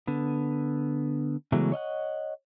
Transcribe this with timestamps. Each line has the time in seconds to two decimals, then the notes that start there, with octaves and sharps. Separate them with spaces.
0.07 D3 B3
1.52 C#3 E3 F#3 G#3 A3 B3
1.72 C#5 D#5 F5 F#5